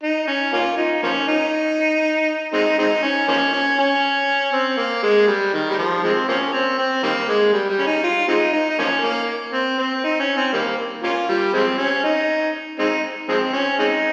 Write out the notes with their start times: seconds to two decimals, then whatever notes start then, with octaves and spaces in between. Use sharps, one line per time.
0.03 D#4
0.28 C#4
0.53 A#3 C#4 F4
0.77 D#4
1.03 F3 A#3 C#4
1.28 D#4
2.53 G#3 C4 D#4
2.79 G#3 C4 D#4
3.03 C#4
3.28 F3 A#3 C#4
3.53 C#4
3.79 C#4
4.53 C4
4.78 A#3
5.03 G#3
5.28 G3
5.54 D#3
5.70 G3
5.78 F3
6.04 F3 G#3 C4
6.29 F3 A#3 C#4
6.53 C4
6.78 C4
7.03 D#3 G3 A#3
7.29 G#3
7.53 G3
7.70 G3
7.79 C#4
7.87 D#4
8.04 F4
8.28 G#3 C4 D#4
8.53 D#4
8.70 D#4
8.79 F3 A#3 C#4
9.03 A#3
9.54 C4
9.79 C4
10.04 D#4
10.20 C#4
10.37 C4
10.53 D#3 G3 A#3
11.03 A#3 C#4 F4
11.29 G3
11.54 F3 G#3 C4
11.78 C#4
12.04 D#4
12.79 G#3 C4 D#4
13.29 F3 G#3 C4
13.53 C#4
13.79 G#3 C4 D#4